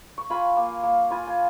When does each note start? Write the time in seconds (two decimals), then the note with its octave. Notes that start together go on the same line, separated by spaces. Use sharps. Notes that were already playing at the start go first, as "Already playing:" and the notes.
0.18 C#6
0.30 F4 G#5 B5
0.57 A#3
0.83 A#3
1.10 F4 G#5 B5
1.27 G#5